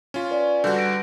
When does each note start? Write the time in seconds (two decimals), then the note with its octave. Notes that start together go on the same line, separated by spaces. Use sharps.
0.14 C#4 F4
0.31 B4 D5 G#5
0.64 D3 G3 F#4 B4 G6
0.76 A#6 D7